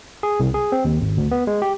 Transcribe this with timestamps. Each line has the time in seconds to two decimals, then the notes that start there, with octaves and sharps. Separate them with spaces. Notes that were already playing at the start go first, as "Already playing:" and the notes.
0.23 G#4
0.40 C2
0.54 G#4
0.72 C4
0.85 D#2
1.01 G#1
1.17 D2
1.31 B3
1.47 G#3
1.62 G4